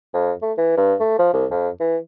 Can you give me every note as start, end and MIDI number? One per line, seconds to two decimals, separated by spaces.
0.14 0.32 41
0.42 0.52 57
0.58 0.74 52
0.77 0.94 43
1.00 1.14 57
1.19 1.30 53
1.33 1.46 36
1.50 1.69 41
1.80 1.97 52